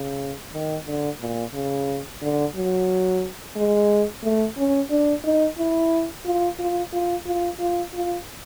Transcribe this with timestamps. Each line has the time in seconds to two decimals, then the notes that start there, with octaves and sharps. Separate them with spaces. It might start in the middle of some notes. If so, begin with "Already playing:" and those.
Already playing: C#3
0.53 D#3
0.86 D3
1.21 A#2
1.54 C#3
2.22 D3
2.55 F#3
3.56 G#3
4.23 A3
4.57 C#4
4.90 D4
5.24 D#4
5.58 E4
6.25 F4
6.59 F4
6.93 F4
7.26 F4
7.59 F4
7.94 F4